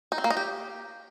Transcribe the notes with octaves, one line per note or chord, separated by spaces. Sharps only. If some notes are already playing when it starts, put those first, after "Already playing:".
D#4
C4
A#3
D#4
G4